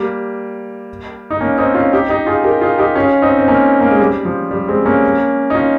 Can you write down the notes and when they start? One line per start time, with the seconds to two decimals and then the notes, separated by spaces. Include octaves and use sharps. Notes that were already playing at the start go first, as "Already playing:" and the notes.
Already playing: G3 A#3
1.30 D#4
1.41 A#3 C#4
1.58 C4 D#4
1.75 C#4 F4
1.93 D#4 G4
2.09 D#4 G4
2.27 F4 G#4
2.44 G4 A#4
2.61 F4 G#4
2.78 D#4 G4
2.96 C#4 F4
3.22 C4 D#4
3.38 C4
3.48 A#3 C#4
3.81 A#3
3.91 G#3
3.99 G3
4.25 F3
4.51 G3
4.68 G#3 C4
4.85 A#3 C#4
5.50 D#4
5.55 C#4 F4